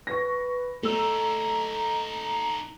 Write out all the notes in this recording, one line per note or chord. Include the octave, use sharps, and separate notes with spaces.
B4 C#6 A#6
A3 D#4 A4 A#5 E6